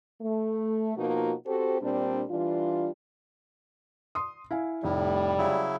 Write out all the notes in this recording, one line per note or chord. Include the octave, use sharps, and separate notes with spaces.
A3
B2 F3 A#3 D#4 F4 F#4
C4 F#4 G4 A4 C5
A#2 G3 C4 D4
E3 G3 D4 F4
C6 D#6
E4 F5 G#5
F1 A2 G3
C#3 F#3 E4